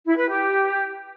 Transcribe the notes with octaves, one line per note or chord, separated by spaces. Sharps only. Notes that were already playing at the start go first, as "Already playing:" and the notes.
E4
B4
G4